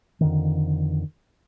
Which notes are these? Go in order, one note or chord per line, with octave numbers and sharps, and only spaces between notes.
F2 D3 D#3